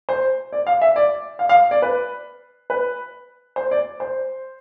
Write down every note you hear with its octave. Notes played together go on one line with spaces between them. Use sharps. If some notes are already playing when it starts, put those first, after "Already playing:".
C5
D5
F5
E5
D5
F5
F5
D5
B4
B4
C5
D5
C5